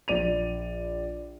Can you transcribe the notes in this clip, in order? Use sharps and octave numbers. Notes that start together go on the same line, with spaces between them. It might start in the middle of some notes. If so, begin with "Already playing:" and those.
A#1 D5 D#7 F7